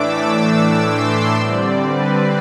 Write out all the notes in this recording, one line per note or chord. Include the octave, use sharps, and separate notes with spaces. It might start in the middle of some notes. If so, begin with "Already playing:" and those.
Already playing: A2 E3 A3 D4 D6 E6
D6
C6
D3 G3 C4 D5
B4